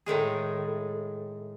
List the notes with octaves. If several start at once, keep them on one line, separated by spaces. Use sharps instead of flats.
A2 D#3 G#3 G#4